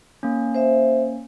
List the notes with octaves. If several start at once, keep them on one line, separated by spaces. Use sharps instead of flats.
A#3 C#4
C5 E5